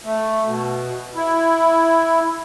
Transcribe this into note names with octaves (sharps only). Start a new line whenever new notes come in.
A3
B2
E4